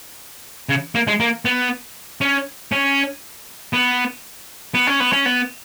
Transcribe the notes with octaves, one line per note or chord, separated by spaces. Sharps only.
C#3
A#3
G#3
A#3
B3
C#4
C#4
B3
B3
C#4
B3
C#4
B3